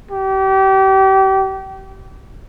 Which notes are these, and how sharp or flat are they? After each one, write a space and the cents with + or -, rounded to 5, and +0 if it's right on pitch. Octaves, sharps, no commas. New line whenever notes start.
G4 -30